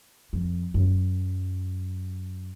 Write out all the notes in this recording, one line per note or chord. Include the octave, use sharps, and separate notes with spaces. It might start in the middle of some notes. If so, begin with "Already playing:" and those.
F2
F#2